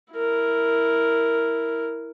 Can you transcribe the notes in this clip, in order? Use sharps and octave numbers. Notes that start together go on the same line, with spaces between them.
E4 A#4